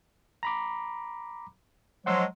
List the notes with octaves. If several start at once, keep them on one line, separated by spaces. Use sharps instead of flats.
A#5 B5 D6
F3 F#3 G#3 F#5 C6 E6